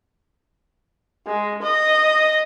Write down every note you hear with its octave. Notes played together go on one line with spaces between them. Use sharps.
G#3
D#5